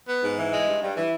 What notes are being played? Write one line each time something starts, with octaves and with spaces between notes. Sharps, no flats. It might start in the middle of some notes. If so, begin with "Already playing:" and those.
B3
G#2
E3
G#3
G2
G2
E3